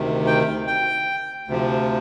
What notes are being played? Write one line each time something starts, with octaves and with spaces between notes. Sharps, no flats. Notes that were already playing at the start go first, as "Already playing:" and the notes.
Already playing: D2 C3 D#3
G5
G5
D2 C3 F3